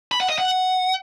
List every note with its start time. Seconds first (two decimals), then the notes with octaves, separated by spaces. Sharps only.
0.11 B5
0.20 F#5
0.29 D#5
0.38 F#5